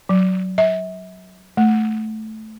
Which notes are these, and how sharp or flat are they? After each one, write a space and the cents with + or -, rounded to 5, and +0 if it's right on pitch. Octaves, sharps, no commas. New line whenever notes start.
F#3 +5
E5 -35
A3 -10